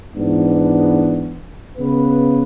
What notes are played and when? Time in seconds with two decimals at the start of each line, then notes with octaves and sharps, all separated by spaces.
0.15 G#2 E3 B3 D4
1.78 C#3 B3 B4